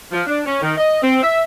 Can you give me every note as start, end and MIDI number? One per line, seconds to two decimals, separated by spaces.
0.11 0.20 53
0.26 0.40 62
0.45 0.59 61
0.61 0.73 51
0.77 1.01 75
1.02 1.17 60
1.21 1.40 76